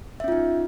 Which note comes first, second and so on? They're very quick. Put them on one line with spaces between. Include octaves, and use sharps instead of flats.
E5 C#4 F4 D#4